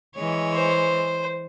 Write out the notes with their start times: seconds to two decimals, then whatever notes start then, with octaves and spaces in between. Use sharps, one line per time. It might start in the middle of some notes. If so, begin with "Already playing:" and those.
0.15 E3 G#3 C#5
0.54 C5